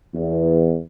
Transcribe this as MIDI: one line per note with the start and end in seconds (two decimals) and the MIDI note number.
0.14 0.79 40